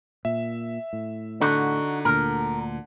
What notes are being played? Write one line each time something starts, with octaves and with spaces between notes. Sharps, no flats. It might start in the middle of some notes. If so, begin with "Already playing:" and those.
A#2 E5
A2
D3 D#4 F#4
D2 A#2 A#4